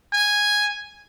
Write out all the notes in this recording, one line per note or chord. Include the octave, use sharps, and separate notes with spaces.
G#5